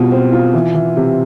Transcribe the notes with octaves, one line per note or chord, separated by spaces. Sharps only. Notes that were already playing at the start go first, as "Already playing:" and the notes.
Already playing: B2 G3 C4 F4
C4
F4
E3
E3
C3